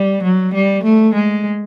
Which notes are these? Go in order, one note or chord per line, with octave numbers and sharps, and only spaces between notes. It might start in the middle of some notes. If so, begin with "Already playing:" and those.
Already playing: G3
F#3
G3
A3
G#3